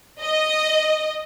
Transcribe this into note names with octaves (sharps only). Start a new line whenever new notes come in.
D#5